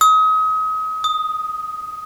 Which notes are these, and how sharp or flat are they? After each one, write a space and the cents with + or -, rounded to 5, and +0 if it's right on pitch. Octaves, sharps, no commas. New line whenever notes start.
D#6 +35
D#6 +5